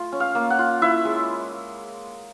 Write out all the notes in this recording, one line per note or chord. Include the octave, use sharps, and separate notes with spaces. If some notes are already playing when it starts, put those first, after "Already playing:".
Already playing: A3 F4
C#4
F5
A#3
F#5
F4
E4 E5
G#3